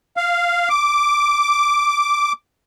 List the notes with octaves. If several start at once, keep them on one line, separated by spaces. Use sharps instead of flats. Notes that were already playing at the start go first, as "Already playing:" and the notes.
F5
D6